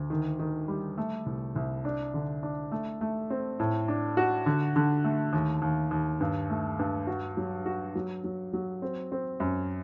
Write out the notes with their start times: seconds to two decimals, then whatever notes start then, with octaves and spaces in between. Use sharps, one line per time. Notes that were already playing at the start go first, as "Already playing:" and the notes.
Already playing: D2
0.10 D#3
0.39 D#3
0.68 G3
0.98 A3
1.26 C2
1.56 C2
1.85 D4
2.14 D3
2.43 D4
2.72 A3
3.01 A3
3.30 C4
3.60 A2
3.88 D4
4.17 F#4
4.46 D3
4.76 D3
5.04 A3
5.33 D#2
5.62 D#2
5.91 D#2
6.20 G2
6.50 A3
6.79 G2
7.07 F#4
7.37 F#3
7.66 F#4
7.95 F#3
8.24 F#3
8.53 F#3
8.82 C4
9.12 C4
9.40 F#2